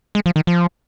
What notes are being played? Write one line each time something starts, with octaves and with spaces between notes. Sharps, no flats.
G#3
F3
D#3
F3